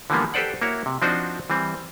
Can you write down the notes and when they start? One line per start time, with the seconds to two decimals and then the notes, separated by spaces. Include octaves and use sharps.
0.10 D3 E3 F3 G3 A#3 B3
0.34 G4 A4 B4 C5 D5 F#5
0.62 A#3 E4 F#4 C#5
0.86 C3
1.02 F3 C4 D4 D#4 F#4 C5
1.50 E3 G3 C4